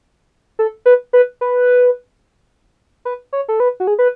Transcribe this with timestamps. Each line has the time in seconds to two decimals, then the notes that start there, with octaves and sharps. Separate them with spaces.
0.59 A4
0.86 B4
1.13 B4
1.41 B4
3.05 B4
3.33 C#5
3.48 A4
3.60 B4
3.80 F#4
3.87 G#4
3.99 B4